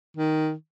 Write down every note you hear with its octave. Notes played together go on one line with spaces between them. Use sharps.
D#3